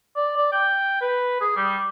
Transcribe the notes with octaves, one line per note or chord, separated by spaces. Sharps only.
D5
D5
G5
B4
G#4
G3